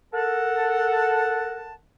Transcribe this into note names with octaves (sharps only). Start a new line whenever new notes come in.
A4 A#4 F#5 A5